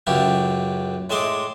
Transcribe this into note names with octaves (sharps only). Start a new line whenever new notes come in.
C#2 F#2 C#3 E4 G4
A2 G#3 D#5 E5 C6 D6